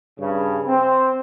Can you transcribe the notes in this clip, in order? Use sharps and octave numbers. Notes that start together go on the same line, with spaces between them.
G2 C#3
C4